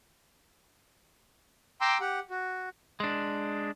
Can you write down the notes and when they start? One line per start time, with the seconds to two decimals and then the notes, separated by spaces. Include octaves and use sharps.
1.81 G5 A#5 C6 D6 E6
2.01 G4 F#5
2.30 F#4
3.00 G#3 D4